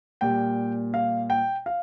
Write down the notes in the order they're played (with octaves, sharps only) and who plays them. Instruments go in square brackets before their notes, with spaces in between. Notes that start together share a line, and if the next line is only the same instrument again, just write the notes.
[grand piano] A#2 G3 G5
F5
G5
F5